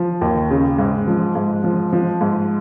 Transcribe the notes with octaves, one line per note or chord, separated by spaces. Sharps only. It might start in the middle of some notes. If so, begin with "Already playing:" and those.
Already playing: F3
D#2
C#3
G#2
F3
G#2
F3
F3
G#2